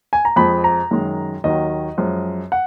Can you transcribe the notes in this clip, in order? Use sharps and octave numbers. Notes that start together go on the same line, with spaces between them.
G#5
A#5
F2 F3 G#3 B5
A#5
F#2 D#3 G#3
D#2 D#3 F#3 D#5
F#2 F3 G#3
F#5